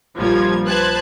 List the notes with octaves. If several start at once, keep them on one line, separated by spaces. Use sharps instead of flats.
A#1 F3 G3 A#3 F4 G#6
B4 C5 A5 F#6 G#6